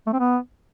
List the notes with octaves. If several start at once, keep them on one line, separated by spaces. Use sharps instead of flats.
A3
C4
B3